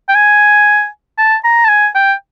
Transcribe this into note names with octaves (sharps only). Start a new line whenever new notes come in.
G5
G#5
A5
A#5
A5
G#5
G5